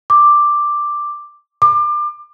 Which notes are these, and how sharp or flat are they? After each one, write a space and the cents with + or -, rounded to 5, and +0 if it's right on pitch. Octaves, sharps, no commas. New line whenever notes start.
D6 +5
D6 +30